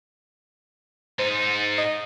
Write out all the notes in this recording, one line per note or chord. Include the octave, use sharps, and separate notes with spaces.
G#2 D#4 C5
D#5